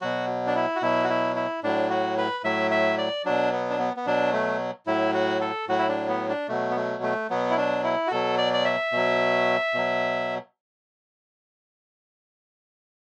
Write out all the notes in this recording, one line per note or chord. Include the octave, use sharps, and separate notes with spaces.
B2 F#3 F#4
D4
E4
F#4
B2 F#3 E4
F#4
E4
E4
A2 F#3 D4
F#4
B4
A2 F#3 E5
E5
D5
B2 F#3 D4
B3
D4
B3
B3
B2 F#3 D4
A3
A2 F#3 E4
F#4
A4
A2 F#3 F#4
E4
D4
B3
D4
B2 F#3 A3
B3
A3
A3
B2 F#3 B3
E4
D4
E4
F#4
B2 F#3 A4
D5
D5
E5
B2 F#3
B2 F#3